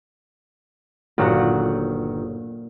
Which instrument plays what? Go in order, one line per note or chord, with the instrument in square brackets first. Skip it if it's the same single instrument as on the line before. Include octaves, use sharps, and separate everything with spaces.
[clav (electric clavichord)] G1 D#3 [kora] A#2 F#3 F#5